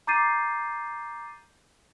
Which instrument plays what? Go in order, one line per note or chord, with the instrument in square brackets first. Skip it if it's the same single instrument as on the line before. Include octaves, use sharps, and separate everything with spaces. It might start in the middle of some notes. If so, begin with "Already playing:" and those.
[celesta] A#5 D6 G6 A6 C7 D#7